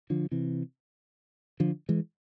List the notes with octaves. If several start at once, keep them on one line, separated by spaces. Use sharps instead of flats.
D3 F3
C3 E3
D3 F3
E3 G#3